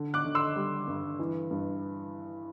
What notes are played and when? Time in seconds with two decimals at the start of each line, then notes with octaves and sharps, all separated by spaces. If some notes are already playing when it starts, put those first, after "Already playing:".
Already playing: D3
0.14 D6 F#6
0.25 D3
0.35 C6 E6
0.56 G3
0.88 G2
1.19 E3
1.51 G2